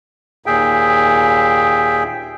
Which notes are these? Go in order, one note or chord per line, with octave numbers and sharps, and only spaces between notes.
D#2 A#2 G#4 E5 G5